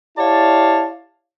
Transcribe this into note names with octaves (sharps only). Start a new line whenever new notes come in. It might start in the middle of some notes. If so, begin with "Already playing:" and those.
E4 G4 C#5 D5 F5 A5